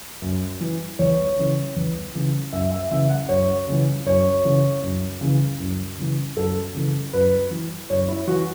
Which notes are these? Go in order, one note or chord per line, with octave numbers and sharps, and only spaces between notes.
F#2
E3
E2 C#5
C#3 E3
E2
C#3 E3
F#2 E5
E5
C#3 E3 E5
F#5
F#2 C#5
C#3 E3
F#2 C#5
C#3 E3
F#2
C#3 E3
F#2
C#3 E3
F#2 A4
C#3 E3
F#2 B4
E3
F#2 C#5
E4
E3 F#4